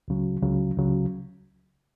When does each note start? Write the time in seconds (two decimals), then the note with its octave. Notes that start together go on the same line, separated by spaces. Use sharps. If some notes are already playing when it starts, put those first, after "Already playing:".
0.08 C#2 C#3 F#3
0.42 C#2 C#3 F#3
0.77 C#2 C#3 F#3